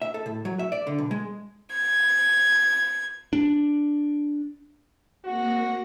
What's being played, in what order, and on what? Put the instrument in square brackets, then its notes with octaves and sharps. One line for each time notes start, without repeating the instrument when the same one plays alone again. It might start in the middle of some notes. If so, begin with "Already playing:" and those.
[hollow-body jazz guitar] E5
A4
A2
F#3
E5
D5
D3
B1
G#3
[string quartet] G#6
[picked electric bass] D4
[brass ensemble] G#1 F#4 [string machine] A#3 F#5 A#6